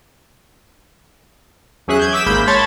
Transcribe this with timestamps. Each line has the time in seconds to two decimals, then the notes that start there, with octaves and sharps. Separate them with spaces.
1.87 E2 F#3 C#4 G#4 E5 F#6
1.99 G6 G#6
2.13 D6 E6 B6 E7
2.26 G#1 G#3 A#3 B5 G6 B6
2.48 C#5 A5 B5 C6 A6